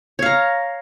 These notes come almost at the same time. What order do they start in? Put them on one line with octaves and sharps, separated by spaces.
C#5 F5 A#5